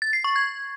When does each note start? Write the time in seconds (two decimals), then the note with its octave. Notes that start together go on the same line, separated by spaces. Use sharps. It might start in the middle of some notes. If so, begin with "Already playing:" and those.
0.02 A6
0.13 C7
0.24 C#6
0.36 G#6